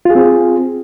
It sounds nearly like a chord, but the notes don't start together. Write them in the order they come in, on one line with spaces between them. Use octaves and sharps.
F4 G#4 C4